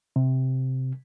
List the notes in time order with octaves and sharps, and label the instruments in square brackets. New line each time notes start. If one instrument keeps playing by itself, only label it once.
[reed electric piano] C3